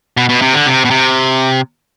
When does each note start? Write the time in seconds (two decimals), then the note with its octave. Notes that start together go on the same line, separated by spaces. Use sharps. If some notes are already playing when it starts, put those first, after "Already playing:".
0.17 B2
0.29 B2
0.42 C3
0.54 D3
0.66 C3
0.85 B2
0.90 C3